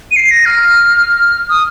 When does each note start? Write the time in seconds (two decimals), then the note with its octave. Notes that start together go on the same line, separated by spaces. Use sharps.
0.11 D#7
0.16 C7
0.31 A#6
0.46 F6
1.49 D#6